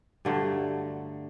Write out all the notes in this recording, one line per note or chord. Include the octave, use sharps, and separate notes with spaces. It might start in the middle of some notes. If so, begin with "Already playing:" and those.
G2 D3 F#3 A3